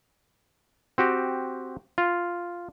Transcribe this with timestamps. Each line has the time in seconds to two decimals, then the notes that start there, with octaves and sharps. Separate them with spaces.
0.98 C4 F#4 G4
1.98 F4